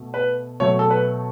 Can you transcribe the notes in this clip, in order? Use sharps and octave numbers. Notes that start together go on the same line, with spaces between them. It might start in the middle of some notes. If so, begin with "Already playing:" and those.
Already playing: B2 A3
B4
B2 F#3 A3 C#5
A4
B4